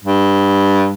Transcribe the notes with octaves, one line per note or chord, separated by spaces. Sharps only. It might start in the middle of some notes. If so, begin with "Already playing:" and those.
G2